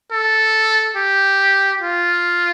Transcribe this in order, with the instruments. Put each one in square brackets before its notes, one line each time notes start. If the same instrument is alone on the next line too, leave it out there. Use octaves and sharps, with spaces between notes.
[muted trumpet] A4
G4
F4